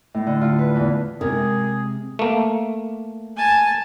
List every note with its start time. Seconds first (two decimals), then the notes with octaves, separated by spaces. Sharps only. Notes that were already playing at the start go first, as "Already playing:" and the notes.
0.14 A2
0.27 D3
0.41 F4
0.58 B4
0.75 E2
1.21 C3 G#3 G#4 A#4
2.19 A3 A#3
3.36 G#5 A5